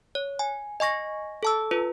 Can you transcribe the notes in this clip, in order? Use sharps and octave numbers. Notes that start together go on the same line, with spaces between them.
C#5
G#5
D#5 G#5 C#6 A#6
A4 A5 E6
F4 B4